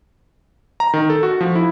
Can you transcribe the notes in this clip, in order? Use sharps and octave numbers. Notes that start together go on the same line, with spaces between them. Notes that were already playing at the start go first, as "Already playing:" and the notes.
A#5
D#3
A4
F#4
F3
E4